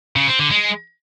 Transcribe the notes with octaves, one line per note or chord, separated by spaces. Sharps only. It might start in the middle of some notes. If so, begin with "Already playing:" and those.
C#3
C4
D3
G#3